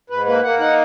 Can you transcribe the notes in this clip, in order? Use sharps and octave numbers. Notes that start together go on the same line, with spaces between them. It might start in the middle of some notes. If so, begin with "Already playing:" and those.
G#2 B4
A#3 B4
A#3 F#5
D#4 F#5